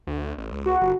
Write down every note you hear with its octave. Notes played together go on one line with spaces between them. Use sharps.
D2
A1
C#2
F#4
G1